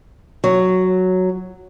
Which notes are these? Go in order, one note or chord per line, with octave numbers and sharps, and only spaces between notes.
F#3